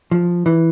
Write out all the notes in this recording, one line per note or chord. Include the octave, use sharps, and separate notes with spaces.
F3
E3